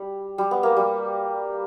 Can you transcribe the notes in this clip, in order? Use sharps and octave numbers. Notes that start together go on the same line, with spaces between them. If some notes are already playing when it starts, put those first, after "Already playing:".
Already playing: G3
G3
B3
A#3
G3